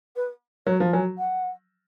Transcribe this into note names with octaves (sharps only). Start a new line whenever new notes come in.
B4
F#3 C#5
F3
F#3 G#5
F#5